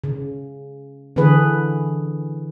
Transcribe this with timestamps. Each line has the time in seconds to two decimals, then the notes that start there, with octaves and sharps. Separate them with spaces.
0.04 C#3
1.16 D3 E3 D4 G#4 B4